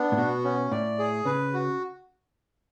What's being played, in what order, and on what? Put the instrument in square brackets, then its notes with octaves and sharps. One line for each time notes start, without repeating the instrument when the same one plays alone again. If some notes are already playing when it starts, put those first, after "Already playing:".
Already playing: [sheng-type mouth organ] B3 D4
[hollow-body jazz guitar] A2
[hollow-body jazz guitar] B2 [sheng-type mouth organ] F#4
[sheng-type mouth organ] C#4
[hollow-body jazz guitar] A2 [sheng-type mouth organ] D5
[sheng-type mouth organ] G#4
[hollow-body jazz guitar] C#3 [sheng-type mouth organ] B4
[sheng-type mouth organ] F#4